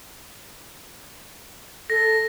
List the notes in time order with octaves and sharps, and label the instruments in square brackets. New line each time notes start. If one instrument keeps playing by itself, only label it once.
[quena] A4 [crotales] A#6